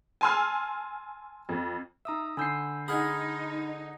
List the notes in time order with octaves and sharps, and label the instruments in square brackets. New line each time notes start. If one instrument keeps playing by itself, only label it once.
[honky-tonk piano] G#5 A5 C6 E6 F6
F2
[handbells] D#4 D#6 E6 [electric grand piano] E5 A#5
[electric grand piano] D3 G6 C7 [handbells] G#5 B5 E6
[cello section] D#4 [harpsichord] G#4 F#5 [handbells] B5 F6 G#6